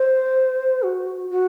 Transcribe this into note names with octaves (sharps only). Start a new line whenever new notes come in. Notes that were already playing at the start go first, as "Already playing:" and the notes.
Already playing: C5
F#4
F#4